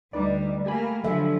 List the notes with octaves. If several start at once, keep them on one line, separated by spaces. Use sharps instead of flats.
D2 G3 D#4 B4 D5
A3 A#3 G4 G#5 B5
D3 F3 F#3 E5